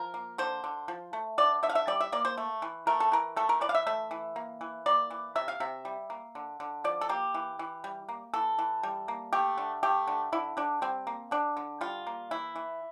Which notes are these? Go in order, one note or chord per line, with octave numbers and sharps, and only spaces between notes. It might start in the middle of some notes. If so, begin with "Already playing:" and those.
Already playing: F3 A#4
A#3
D3 C5
D3
F3
A3
D3 D5
D3 E5
F5
E5
G3 D5
E5
A#3 D5
C5
A3
E3
A3 A#4
A4
E3 A#4
A3 A4
A#4
E3 D5
F5
E5
A3 E5
E3
A#3
E3
A#3 D5
E3
C3 E5
F5
C3 E5
G3
A#3
D3
D3
F3 D5
A4
A#3 G4
E3
E3
G3
A#3
E3 A4
E3
G3
A#3
A3 G4
D3
A3 G4
D3
D3 E4
D3 D4
G3 C4
A#3
D3 D4
D3
G3 F4
A#3
E3 E4
E3